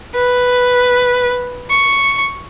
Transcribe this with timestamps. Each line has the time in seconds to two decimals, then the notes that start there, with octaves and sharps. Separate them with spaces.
0.15 B4
1.70 C#6